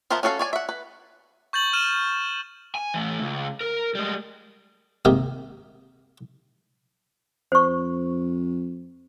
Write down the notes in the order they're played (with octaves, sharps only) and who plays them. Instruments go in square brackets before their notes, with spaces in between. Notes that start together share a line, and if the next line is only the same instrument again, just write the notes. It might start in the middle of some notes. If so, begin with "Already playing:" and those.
[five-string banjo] F3 B3 A#4 C5 E5
C#4 F#4 A4 C#5 F5
C#5 D5 G#5
E5 F#5
B4
[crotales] C#6 G6 A6 F#7
F6 D#7 E7
[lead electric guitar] G#5
E3 A3
C#2
A#4
G3 G#3
[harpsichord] G#2 C3 D#3 A#3 G4
[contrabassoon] F2 [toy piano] C5 C#6